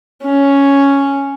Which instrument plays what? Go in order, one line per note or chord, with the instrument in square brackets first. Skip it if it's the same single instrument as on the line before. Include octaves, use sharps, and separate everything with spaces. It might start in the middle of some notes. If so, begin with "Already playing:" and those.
[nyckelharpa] C#4